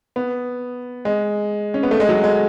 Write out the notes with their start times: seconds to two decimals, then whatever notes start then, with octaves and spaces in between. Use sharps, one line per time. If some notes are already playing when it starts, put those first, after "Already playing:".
0.16 B3
1.05 G#3
1.74 C#4
1.83 B3
1.91 A3
2.00 G#3
2.09 F#3
2.24 G#3